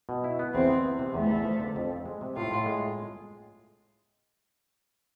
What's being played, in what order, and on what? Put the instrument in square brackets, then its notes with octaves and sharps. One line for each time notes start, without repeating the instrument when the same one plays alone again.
[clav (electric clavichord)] B2
E4
B3
[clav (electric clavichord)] E2 [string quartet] C4
[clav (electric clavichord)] B3
E3
C3
[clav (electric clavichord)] E2 [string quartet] A3
[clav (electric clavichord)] E2
F3
D3
F2
C4
G#3
C3
[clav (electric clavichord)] A2 [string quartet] F4
[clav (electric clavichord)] A2
G#3